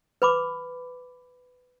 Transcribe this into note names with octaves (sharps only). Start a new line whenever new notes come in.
B4 B5 D6